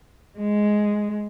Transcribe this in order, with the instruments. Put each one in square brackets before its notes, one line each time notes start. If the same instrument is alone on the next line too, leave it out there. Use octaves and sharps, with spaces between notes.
[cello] G#3